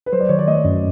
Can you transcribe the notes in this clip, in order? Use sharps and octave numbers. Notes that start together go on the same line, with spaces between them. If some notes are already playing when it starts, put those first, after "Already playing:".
B4
F#3 C5
D5
D#3 C#5
D5
A3 D#5
F#2